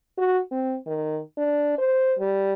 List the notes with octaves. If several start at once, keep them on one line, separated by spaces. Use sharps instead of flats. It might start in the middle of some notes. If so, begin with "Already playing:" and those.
F#4
C4
D#3
D4
C5
G3